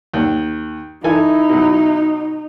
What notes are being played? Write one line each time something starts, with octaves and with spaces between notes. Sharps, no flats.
D#2
E3 D#4 E4 A4 G#5
B2 F#3